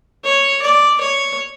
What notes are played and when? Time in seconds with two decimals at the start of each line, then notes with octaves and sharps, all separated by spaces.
0.24 C#5
0.62 D5
1.00 C#5